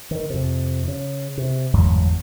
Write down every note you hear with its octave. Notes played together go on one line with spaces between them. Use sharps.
D#3
F2 C3
C#3
C3
G1 E2 G#2 F#3